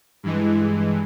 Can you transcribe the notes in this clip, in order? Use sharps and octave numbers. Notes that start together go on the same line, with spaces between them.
G2 E3 G#3